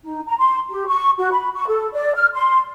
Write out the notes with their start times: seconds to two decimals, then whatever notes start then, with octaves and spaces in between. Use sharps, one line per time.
0.04 D#4
0.26 A#5
0.38 C6
0.69 G4
0.87 C#6
1.18 F#4
1.31 B5
1.54 C#6
1.67 A4
1.93 D5
2.15 F6
2.33 C6